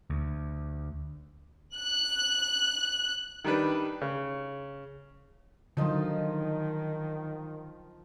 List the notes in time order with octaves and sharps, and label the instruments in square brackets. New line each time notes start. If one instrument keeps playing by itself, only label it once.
[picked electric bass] D2
[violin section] F#6
[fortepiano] D#3 G3 D4 B4
C#3
[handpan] D3 F#3 [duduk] D#3 [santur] F3 D#4 F4